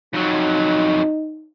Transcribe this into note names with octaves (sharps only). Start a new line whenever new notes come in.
F2 F#3 D#4